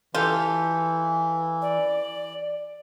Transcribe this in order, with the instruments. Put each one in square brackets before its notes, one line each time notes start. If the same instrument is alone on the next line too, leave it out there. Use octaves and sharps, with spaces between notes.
[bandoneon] E3 [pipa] F4 [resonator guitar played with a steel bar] G4 A4 F5
[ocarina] D5